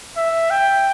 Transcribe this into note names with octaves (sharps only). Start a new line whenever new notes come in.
E5
G5